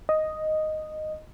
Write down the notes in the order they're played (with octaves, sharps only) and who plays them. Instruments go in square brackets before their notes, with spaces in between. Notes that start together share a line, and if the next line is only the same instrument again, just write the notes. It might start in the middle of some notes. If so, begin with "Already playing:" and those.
[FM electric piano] D#5